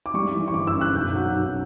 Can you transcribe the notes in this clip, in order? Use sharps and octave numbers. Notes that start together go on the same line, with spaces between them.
D6
G3 C#6
E3
C#6
G1 D6
E6
F#2
F#6
B1 G6
F#3
B1